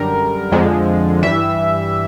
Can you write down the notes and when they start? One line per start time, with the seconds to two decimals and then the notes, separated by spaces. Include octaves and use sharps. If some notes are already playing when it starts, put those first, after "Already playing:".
Already playing: F#2 D3 G3 A#4
0.51 F2 D3 F3 G#3
1.23 G2 E3 G3 E5